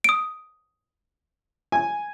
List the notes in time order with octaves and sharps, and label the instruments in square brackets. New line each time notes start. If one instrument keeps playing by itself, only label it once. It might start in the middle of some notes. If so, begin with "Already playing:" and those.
[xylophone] D#6 D7
[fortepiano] G#5